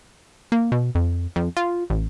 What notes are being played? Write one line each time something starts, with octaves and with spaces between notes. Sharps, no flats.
A#3
B2
F2
F2
F4
A1